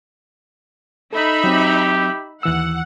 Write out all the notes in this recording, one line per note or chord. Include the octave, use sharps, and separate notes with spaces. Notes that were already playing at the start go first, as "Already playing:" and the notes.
D#4 A4 E5 B5
F#3 C4 G4
D#2 E3 F#5 E6